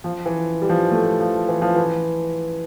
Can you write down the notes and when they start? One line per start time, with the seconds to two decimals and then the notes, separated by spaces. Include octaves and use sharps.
0.04 F3
0.26 E3
0.61 G3
0.70 F3
0.91 A3
1.20 F3
1.48 E3
1.62 F3
1.75 E3